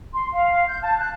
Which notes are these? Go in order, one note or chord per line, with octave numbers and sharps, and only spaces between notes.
C6
F5
G6
A5
F#6